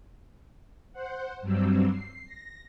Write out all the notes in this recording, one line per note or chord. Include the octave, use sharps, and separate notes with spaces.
C5 F#5
G2 F#3 G3 C4 E6
C7
A#6